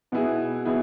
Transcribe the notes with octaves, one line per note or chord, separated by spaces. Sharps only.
B2 B3 E4 G#4
B2 B3 E4 G#4